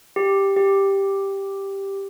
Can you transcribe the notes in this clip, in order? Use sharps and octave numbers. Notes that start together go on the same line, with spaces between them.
G4
G4